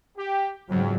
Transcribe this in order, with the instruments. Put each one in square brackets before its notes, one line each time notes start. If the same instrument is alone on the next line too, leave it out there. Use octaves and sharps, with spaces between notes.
[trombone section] G4
[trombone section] F2 [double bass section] G#2 C#3 F#3